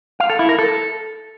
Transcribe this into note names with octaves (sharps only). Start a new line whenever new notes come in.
F5
A4
E4
A#4
A4